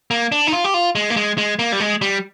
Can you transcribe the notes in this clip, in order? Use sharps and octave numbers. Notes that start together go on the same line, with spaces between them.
A#3
D4
D#4
F4
G4
F4
G#3
A#3
G#3
G#3
A#3
G3
G#3
G3